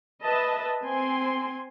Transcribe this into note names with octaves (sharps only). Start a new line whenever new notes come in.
B4 D#5 E5 A5
C4 G#5 C6